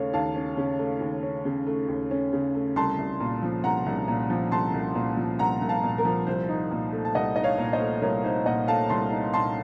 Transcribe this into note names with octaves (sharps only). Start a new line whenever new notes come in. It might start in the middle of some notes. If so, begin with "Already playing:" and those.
Already playing: D#2 C#3 A3 C#4 C#5 F5
D#2 F5 A5
C#4
C#3
A3
D#2
C#4
C#3
A3
D#2
C#4
C#3
A3
C2 A5 C6
C2
A#2
F3
C2 F#5 A#5
C2
A#2
F3
C2 A5 C6
C2
A#2
F3
C2 F#5 A#5
C2
F5 A5
A#2
A#4
F3
C2 C5
D#4
A#2
A3
A5
C2 D#5 F#5
D#4 D#5
C#5 F5
A#2
C5 D#5
A3
C2 A#4 C#5
D#4 C5
A#2 D#5 F#5
A3 F5 A5
C2 A5 C6
D#4
A#2 A5 C6